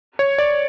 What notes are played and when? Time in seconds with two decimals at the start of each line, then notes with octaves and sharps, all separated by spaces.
0.19 C#5
0.38 D5